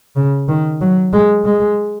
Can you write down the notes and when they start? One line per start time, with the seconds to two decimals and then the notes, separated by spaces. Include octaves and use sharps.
0.16 C#3
0.49 D#3
0.81 F#3
1.13 G#3
1.45 G#3